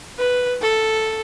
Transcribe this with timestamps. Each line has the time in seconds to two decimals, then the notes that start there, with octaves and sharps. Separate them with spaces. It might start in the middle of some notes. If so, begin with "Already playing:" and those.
0.18 B4
0.61 A4